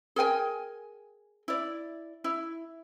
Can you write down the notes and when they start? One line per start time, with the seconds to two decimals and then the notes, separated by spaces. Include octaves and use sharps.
0.16 G#4 A#4 G5 G#5
1.48 E4 D5
2.24 E4